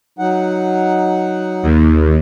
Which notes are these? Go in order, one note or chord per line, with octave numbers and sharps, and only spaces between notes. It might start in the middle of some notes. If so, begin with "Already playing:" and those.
F#3 D#4 F#5
D#2